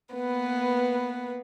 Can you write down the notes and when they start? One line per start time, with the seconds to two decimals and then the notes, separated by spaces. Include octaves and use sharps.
0.15 A#3 B3 B4